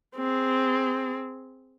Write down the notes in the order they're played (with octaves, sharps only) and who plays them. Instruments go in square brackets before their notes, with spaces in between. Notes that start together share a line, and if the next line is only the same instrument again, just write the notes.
[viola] C4 G#4